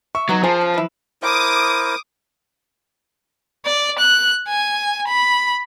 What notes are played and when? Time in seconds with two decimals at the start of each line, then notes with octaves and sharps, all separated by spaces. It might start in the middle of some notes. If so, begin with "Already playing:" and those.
0.15 E5 C#6
0.29 F#3 B3 D#4
0.44 F3 G#4 A#4 C5 A5
0.61 C#3
0.74 E4 B4
1.23 E4 A#4 C5 D6 D#6
3.66 D5
3.99 F#6
4.48 G#5
5.08 B5